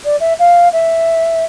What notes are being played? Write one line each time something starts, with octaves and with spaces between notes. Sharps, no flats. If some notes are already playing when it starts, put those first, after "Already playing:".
D5
E5
F5
E5